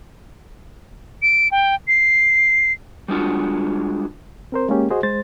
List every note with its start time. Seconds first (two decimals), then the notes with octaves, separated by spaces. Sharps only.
1.22 D7
1.51 G5
1.88 C7
3.08 G3 G#3 D4 F4 F#4
4.52 C4 A#4 C5
4.69 G#3 A#3 C#4 G4
4.90 F#4 G#4 C5 D#5
5.03 G#3 C5 A6